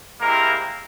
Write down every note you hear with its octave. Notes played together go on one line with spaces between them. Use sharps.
G#3 A#3 C4 E4 G4 A#4